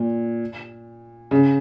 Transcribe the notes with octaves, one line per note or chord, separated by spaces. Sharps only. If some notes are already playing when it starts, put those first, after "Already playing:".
Already playing: A#2
C#3